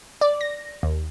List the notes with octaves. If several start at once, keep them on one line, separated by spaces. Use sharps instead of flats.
D5
A#6
D#2